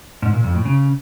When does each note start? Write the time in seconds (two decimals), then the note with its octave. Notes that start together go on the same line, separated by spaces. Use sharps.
0.22 G#2
0.33 A#2
0.44 F2
0.55 A2
0.65 C#3